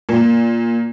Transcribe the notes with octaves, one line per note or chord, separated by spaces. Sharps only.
A#2